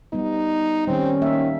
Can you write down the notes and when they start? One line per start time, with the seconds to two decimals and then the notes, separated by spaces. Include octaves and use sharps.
0.13 G3 B3 D#4
0.87 D#3 G3 C4 C#4
1.22 D#3 A#3 E5